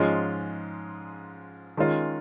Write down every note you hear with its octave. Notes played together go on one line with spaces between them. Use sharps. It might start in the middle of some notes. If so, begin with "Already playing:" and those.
Already playing: G#2 F3 G#3 C#4 F4
D#3 G#3 C#4 F4